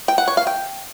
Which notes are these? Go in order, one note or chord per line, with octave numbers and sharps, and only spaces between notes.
G5
F#5
C#5
F5
G5